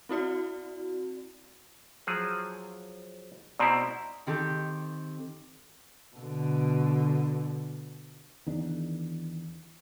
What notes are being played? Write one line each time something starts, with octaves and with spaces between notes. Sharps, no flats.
C4 E4 F#4 D5
F3 F#3 G#4
B2 C4 E4 D5 A#5 C6
D#3 C4 G4 A4
B2 D3
E2 D#3 D4